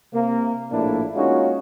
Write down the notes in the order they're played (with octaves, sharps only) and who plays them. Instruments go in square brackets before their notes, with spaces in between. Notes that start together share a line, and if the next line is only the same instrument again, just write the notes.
[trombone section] C3 A#3
A#1 A2 A3 A#3 D4 E4
G#3 A#3 C#4 D#4 F4 F#4